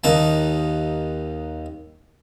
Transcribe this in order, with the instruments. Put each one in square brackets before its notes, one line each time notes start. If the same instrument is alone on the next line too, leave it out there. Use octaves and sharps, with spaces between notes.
[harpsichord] D#2 D#4 A5